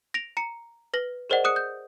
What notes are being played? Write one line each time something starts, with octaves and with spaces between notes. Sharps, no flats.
A#6 D7 F7
A#5 C#7
B4 A#6 F#7
G#4 A#4 C5 D5 D#5 F#5
G#4 D#6 F#6 C#7
G6